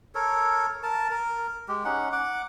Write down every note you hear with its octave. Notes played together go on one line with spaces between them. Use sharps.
A4 A#4 C#5
A#4 A5
A#4
G#3 G4
C#4 D#4 F#5
F#5 D6